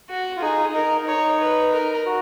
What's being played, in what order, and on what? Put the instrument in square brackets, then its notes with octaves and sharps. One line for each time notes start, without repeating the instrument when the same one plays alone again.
[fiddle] F#4
[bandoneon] F4
[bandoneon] D#4 [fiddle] G#4
[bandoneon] D#4 [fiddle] A#4
[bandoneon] D#4 [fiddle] C#5
[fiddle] B4
A#4
[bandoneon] F#4